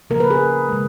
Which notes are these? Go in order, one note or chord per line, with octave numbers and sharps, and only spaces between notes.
C#3 F3 A#3 A#4
B4
G#4
C#3 G#3